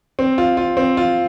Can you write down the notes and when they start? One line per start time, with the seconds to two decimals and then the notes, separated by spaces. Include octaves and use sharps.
0.19 C4
0.38 F4
0.57 F4
0.77 C4
0.97 F4